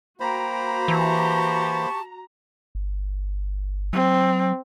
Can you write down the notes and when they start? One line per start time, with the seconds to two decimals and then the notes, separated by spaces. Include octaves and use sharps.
0.20 A#3 F#4 C5 G5 A#5 B5
0.88 E3 G4 A5 C#6
2.75 G1
3.93 F#3 C4